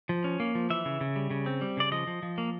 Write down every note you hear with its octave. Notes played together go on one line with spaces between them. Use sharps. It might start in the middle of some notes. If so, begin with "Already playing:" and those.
F3
C#4
A#3
F3
E3 E5
C#3
C#3
G3
C#3
C4
G3
C#3 D5
F3 D#5
F3
F3
A#3